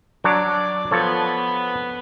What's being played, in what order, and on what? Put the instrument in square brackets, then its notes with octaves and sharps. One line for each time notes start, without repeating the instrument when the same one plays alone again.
[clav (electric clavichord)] F#3 D4 C#5 [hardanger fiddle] D5 D6
[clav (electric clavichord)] F3 A4 C#5 [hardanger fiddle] B3 B4